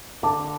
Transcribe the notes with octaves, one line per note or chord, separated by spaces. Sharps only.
D3 A5 D6